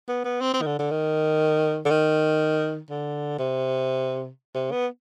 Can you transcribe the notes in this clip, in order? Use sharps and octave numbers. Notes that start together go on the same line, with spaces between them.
B3
B3
C4
C4
D#3
D3
D3
D#3
D3
D#3
D3
C3
C3
B3